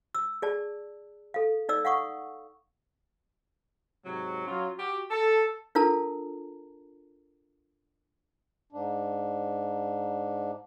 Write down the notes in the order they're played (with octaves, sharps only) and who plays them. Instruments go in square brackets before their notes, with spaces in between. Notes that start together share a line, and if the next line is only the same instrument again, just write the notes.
[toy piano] E6
G#4 D5 A5
A4 F5
D#4 D5 E6
F5 F#5 C#6 D#6
[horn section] G#2 C3 F#3
F#3 C#4 F4
F#4 G4
A4
[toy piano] D4 F4 A4 A#4 A5 A#5
[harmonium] G#2 D4